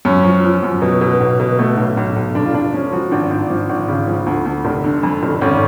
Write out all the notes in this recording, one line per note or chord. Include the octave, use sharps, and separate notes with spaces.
F#2 C#4
F3
F3
F#2
B2
B2
B1
B2
B2 A3
B1
B1
B1
F1 D4
F4
F1 D4
F3 C#4
F3 F#4
G#1 D4
G#1
F3
G#1
C#3
F3
D2
D2
F1
D3
F2
F1
G#1 C#4